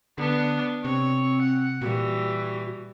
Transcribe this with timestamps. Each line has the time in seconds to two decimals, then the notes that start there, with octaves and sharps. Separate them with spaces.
0.18 D3 B3 D4
0.85 C3 C4 C#5
1.42 F#5
1.81 A#2 E3 G3 F#4